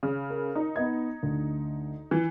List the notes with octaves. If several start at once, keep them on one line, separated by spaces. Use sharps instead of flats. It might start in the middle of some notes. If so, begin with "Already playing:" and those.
C#3
A#4
D#4
B3 D#5 G#6
D2
E3